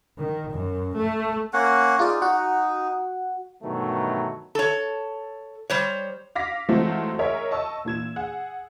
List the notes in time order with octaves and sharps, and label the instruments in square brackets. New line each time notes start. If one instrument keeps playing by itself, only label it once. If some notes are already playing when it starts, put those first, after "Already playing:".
[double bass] D#3
F#2
A3
[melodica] A#3 C#4 F#5
[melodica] D#4 [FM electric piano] F4 G#4 D5
[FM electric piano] F#4 F#5
[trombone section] G2 B2 D#3 E3 F#3 A3
[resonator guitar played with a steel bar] A4 C#5
G3 C5 C#5
[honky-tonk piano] F5 D6 A#6 B6
E3 F#3 G#3 A3 C4 F4
G#4 A#4 C#5 D#5 E5
D#5 A5 C#6 E6
A#2 E3 G#6 E7
G#4 F#5